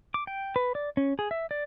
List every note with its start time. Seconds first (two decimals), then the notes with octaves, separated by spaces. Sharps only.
0.14 D6
0.27 G5
0.56 B4
0.75 D5
0.97 C#4
1.19 G#4
1.31 E5
1.51 D5